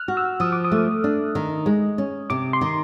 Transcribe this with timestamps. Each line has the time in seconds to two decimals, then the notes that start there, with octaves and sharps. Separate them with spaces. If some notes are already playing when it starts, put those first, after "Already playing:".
Already playing: F6 F#6
0.08 F#4
0.17 E6
0.40 F3 D#6
0.52 D6
0.65 D#6
0.72 A3
1.04 D4
1.35 D#3
1.66 G#3
1.98 C#4
2.30 C3 D6
2.53 C6
2.61 D#3